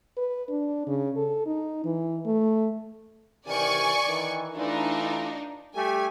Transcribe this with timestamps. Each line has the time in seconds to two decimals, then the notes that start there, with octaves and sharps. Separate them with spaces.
0.17 B4
0.49 D4
0.87 C#3
1.16 A4
1.46 D#4
1.85 E3
2.26 A3
3.47 C3 D#3 E3 D5 G#5 C#6
4.07 D#3 E3
4.56 E3 A3 D4 D#4 F4
5.75 G3 A3 G4 G#5